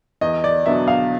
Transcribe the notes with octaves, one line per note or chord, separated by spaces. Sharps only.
E2 D#5
D5
B2 F#3 B3 D4 E5
F5